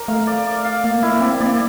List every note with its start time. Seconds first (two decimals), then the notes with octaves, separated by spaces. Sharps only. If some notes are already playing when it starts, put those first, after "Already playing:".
Already playing: A#4 D5
0.08 A3 F5
0.27 D5
0.47 D5
0.65 F5
0.84 A#3 F5
1.03 A#3 E4
1.21 C4 D5
1.34 C4
1.40 A#3 D5